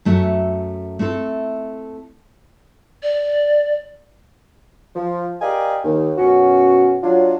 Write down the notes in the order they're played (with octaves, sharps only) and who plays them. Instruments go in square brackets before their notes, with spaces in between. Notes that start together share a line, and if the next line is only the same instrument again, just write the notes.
[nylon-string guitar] F#2 A3 F#4 E5
A3 C4 E4 A4
[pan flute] D5
[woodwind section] F3
G4 A#4 D5 D#5 F5 G#5
D#2
F#2 B2 C#4 F#4
F#3 D4 F4